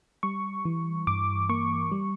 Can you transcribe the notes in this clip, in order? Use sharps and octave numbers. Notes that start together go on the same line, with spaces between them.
G3 C#6
E3
G2 D6
A#3 C#6
G3